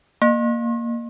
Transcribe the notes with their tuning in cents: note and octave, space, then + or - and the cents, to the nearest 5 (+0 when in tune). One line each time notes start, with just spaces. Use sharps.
A#3 +0 F5 +0